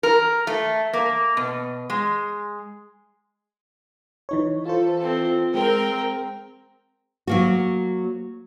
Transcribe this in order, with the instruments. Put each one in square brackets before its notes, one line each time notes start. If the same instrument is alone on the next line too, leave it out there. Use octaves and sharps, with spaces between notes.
[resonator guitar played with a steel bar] A#4
A3
A#3
B2
G#3
[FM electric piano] E3 D#4 C#5
[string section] E3 A4 [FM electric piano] F4 C5
[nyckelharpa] C4
[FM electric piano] G#3 [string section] C4 A#4 [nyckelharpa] G5
[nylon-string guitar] F#3 A#3 F#4